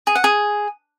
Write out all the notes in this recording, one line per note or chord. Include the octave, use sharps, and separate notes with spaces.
G#4
F#5
G#4